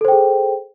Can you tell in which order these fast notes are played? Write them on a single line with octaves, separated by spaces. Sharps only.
A4 C5 G5 G#4